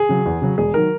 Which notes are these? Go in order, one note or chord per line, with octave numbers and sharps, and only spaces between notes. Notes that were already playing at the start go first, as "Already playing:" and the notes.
Already playing: G#4
C#3 F#3
E2
C#3 F#3
E1 G#4
D#3 F#3 A#4